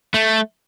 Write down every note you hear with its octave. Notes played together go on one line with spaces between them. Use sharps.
A3